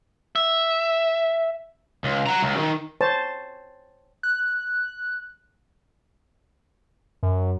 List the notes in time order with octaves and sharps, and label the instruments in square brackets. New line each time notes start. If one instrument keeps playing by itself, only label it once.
[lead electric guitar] E5
[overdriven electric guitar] C#2
F#5 A#5
C#2
D#3
[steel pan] C5 C#5 A5
[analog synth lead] F#6
F#2